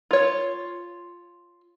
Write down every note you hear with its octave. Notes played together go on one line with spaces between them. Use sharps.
F4 C#5